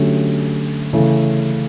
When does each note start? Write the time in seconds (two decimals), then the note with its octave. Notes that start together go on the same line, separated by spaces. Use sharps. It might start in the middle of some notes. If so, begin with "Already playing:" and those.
Already playing: D3 F#3 A3 C#4 G4
0.93 C#3 E3 A3